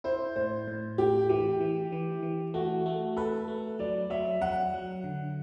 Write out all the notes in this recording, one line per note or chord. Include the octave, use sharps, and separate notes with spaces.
E4 C5
A2 C5
A2
A3 G4
E3 G4
E3
E3
E3
A3 F#4
A3
A4 B4
A3
F#3 D5
F#3 E5
F#3 F#5
F#3
D3